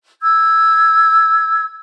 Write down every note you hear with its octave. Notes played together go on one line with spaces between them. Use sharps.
E6 G#6